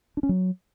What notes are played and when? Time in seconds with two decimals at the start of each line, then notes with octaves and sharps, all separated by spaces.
0.17 D4
0.23 C#4
0.29 F#3